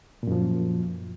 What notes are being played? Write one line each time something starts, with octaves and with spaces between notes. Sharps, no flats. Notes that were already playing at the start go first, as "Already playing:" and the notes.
F#2 A#2 F3